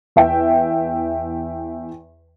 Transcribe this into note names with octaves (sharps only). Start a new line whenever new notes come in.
E2 E5 G5